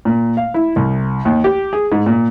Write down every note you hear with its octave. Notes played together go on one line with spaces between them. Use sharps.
A#2
F5
E4
C2
D#2
G4
G#4
G#2
A#2